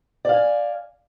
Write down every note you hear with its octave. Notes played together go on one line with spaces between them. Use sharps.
D5 F5 G#5